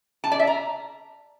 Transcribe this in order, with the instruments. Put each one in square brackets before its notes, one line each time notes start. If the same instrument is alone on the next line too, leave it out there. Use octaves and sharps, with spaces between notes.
[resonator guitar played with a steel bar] A5
D5
E5
A#5